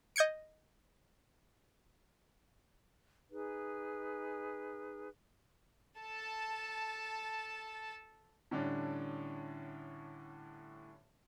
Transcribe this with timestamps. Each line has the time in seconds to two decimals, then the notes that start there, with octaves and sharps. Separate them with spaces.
0.16 D#5 G6 G#6 C#7 D7
3.30 D#4 G#4 B4
6.00 A4 A5
8.51 A2 D3 G3 C#4 D4